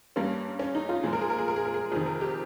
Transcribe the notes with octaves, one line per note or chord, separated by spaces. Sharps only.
G2 G3 A#3 C#4
C#4
D#4
F4
A#2 F3 G#3 G#4
A#4
G#4
A#4
G#4
A#4
G#4
A#4
G#4
F2 C3 D#3 G#4
A#4
G4